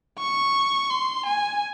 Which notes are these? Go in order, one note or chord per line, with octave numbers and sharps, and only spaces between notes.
C#6
C6
G#5